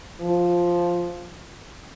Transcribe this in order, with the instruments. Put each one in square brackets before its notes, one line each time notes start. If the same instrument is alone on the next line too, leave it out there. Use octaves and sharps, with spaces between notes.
[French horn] F3